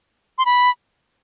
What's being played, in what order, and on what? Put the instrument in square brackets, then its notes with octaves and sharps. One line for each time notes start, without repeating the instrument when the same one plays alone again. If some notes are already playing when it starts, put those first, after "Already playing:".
[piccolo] C6
B5